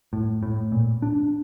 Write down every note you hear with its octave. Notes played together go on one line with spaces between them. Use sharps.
A2
A2
A#2
D4